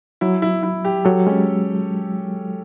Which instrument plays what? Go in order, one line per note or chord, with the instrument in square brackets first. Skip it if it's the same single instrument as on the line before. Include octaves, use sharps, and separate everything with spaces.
[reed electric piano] F#3 [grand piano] E4
[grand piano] E4
E4
G4
[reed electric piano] F#3 [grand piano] A4
[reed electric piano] G#3 [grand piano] C#4